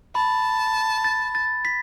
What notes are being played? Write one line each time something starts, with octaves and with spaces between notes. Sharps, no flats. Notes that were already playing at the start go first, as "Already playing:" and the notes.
A5 B5
A6
A6
B6